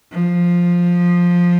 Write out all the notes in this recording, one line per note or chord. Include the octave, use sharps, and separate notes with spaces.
F3